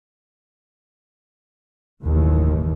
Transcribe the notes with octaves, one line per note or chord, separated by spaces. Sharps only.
F#1 D#2 A2 D#3 E3